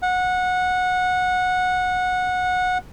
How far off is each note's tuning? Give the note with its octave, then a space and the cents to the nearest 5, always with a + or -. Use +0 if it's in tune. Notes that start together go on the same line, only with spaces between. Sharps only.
F#5 -20